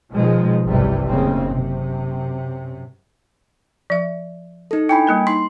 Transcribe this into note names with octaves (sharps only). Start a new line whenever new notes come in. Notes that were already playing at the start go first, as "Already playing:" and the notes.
B2 D#3 F3 G#3
G1 C2 F#2 C3 E3 G3
F#1 D#2 A2 C#3 A#3 C4
F#2 C3
F3 E5
D#4 A4
D4 E4 G5 G#5 B5
G3 A#3 A#4
D#4 C6